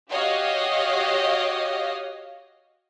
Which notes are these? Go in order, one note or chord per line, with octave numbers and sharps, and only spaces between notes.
F#4 G4 C#5 D#5 F5